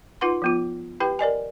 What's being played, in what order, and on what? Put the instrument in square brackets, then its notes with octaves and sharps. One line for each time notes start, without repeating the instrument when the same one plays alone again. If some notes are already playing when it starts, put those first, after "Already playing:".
[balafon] D#4 F4 B4 F#5 C6
F3 B3 F4
E4 G4 B4 G5
A#4 D5 D#5 G#5